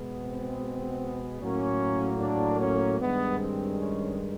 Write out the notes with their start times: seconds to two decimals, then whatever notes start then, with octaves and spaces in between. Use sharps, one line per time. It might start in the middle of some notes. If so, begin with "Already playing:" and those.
Already playing: B2 G#3 B3
0.21 C4
1.40 A2 F#3 A#3 C#4
2.21 D4
2.59 C#4
2.99 G2 D#3 G#3 B3
3.39 C4
3.79 C#4